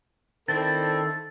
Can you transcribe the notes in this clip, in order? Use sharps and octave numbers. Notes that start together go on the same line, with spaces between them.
D#3 C4 D4 E4 A4 A6